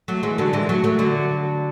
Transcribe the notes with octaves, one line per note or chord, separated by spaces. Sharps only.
F#3 A3
E3 G#3
D3 F#3
E3 G#3
F#3 A3
F#3 A3
D3 F#3